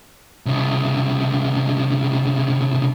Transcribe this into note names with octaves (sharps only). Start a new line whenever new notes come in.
C2 C#3